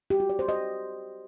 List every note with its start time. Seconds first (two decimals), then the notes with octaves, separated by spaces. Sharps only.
0.10 G4
0.20 F#4
0.29 D5
0.39 C5
0.49 D#5